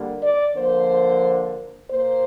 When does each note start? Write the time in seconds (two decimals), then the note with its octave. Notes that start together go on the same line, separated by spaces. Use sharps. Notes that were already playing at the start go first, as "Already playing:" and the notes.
Already playing: D3 G3 A#3
0.20 D5
0.54 D3 F3 A#3 C5
1.91 A#2 A#3 C5